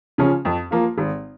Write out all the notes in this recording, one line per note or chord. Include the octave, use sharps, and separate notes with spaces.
C#3 F3 C#4
F2
F3 A#3 F4
G#1